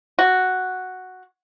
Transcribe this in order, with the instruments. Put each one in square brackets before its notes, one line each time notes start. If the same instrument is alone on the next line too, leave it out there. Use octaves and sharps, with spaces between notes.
[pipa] F#4